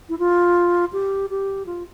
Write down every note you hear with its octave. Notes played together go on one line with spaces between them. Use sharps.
E4
F4
G4
G4
F4